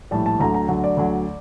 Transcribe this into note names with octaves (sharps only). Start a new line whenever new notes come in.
A#1 A2 G3 A5
A5
D2 D3 F#3 A#5
A#5
D2 D3 F#3
D5
D2 D3 F#3